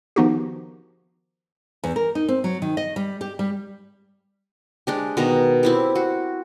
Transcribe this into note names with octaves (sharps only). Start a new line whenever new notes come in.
D#3 F3 B3 D#4 F#4 G4
E2
A#4
D#4
C4
F#3
D#3
D#5
G3
G4
G3
G#3 D4 G4
B2 D#3 A#5
C4 E4 G4
F#4